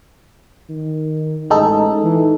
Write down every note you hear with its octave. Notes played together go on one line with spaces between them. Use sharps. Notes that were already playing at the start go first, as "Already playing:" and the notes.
D#3
A1 G#3 D#4 A4
E3